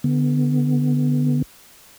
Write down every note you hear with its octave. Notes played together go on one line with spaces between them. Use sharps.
D3 B3